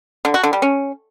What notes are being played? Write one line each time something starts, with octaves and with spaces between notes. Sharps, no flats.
D3
F#4
D3
G3
C#4